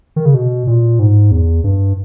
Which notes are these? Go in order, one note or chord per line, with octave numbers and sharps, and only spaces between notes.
D#3
C#3
B2
A#2
G#2
E2
G2